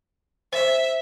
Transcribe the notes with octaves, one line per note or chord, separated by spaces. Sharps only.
C5 E5